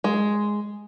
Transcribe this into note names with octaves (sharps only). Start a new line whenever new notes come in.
G#3